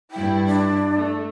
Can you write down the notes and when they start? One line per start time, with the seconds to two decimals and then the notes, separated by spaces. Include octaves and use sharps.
0.11 G2 E4 G5
0.46 D4
0.95 A3